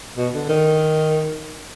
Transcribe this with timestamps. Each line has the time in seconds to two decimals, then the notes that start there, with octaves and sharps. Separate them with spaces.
0.17 B2
0.34 D3
0.49 D#3